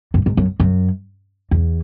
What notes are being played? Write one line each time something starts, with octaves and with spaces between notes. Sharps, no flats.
F#2
G#2
F#2
F#2
E2